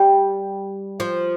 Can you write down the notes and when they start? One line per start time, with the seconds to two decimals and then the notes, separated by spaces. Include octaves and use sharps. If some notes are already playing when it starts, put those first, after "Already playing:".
Already playing: G3
1.00 F3